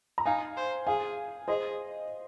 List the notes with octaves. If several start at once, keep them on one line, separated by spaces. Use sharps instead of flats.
A#5
D#4 F5 G#5
C5
G#4 F5 G#5
G#4 C5 D#5